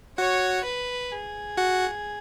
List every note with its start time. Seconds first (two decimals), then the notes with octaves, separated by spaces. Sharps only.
0.18 F#4 C#5 F#5
0.64 B4
1.12 G#4
1.57 F#4 F#5